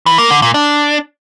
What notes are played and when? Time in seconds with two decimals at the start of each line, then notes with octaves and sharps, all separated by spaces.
0.06 E3
0.18 A#3
0.30 D3
0.42 A#2
0.54 D4